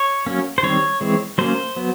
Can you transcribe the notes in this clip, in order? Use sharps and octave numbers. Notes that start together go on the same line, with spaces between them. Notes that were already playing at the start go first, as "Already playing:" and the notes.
Already playing: C#5
F#3 A#3 C#4
C5
D#3 G3 C4 C#5
E3 G#3 C4
F#3 A#3 C#4 C5
F#3 B3